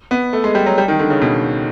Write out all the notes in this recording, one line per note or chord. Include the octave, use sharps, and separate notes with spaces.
B3
A3
G#3
G3
F#3
G3
D#3
D3
C#3
B2